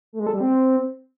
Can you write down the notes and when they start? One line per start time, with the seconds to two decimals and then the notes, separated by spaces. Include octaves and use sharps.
0.13 A3
0.20 G#3
0.27 A4
0.34 G3
0.40 C4